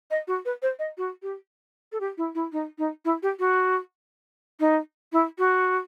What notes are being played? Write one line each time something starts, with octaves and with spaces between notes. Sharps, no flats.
D#5
F#4
B4
C5
D#5
F#4
G4
A4
G4
E4
E4
D#4
D#4
E4
G4
F#4
D#4
E4
F#4